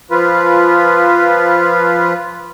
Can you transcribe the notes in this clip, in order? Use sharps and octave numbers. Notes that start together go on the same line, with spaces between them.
F3 F4 B4